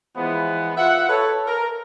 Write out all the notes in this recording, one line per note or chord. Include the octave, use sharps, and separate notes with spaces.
E3 F3 G#3 B3
F4 E5 F#5
A4 B4 C#5
A#4